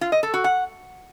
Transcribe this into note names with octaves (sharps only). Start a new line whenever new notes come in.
F4
D#5
A4
F#4
F#5